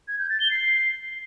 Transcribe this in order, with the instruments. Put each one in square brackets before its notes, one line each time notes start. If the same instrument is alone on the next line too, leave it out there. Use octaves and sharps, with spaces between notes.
[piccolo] G#6
G6
A6
G7
C7